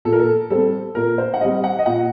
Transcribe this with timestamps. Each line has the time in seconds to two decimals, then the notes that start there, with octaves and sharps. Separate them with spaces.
0.05 A#2 A4
0.12 A#4
0.19 A4
0.50 G3 C4 A4
0.95 A#2 A#4
1.18 C5
1.34 F#5
1.41 G3 C4 D#5
1.64 F#5
1.79 D#5
1.86 A#2 F#5